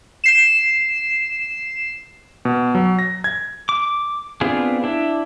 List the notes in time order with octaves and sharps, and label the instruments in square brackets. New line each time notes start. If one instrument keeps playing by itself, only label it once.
[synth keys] C7 E7
[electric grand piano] B2
F#3
A#6
G#6
[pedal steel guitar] D6
B3 C4 D4 F4 G#4
D4 E4